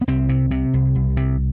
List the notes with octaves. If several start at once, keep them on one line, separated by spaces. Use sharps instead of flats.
B3
C2 C4
C3
C3
C2
C2
C3